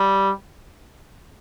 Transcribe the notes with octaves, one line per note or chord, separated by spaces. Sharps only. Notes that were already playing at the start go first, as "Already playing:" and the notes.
Already playing: G3